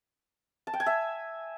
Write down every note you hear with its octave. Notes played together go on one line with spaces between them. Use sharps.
A5
G5
G#5
E5